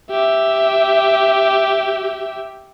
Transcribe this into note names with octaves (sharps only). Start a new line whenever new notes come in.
G4 E5